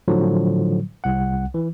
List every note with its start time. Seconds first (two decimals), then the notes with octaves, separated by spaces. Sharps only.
0.08 A2 D3 F3 F#3
1.04 C2 F#5
1.54 E3